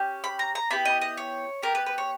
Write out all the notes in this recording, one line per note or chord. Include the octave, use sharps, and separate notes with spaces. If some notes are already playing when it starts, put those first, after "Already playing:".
Already playing: C#4 G4
B5
A#5
A#5
B3 E4 G4 B5
D#5
D#5
C#5
B3 G4 A#4
B4
B4
C#5